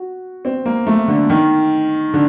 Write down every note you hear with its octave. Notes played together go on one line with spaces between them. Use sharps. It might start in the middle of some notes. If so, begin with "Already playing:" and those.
Already playing: F#4
C4
A#3
A3
D3
D#3
D3